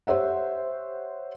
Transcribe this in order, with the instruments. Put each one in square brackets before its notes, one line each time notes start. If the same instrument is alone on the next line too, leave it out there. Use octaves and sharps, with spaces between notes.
[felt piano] G4 C5 C#5 E5 F#5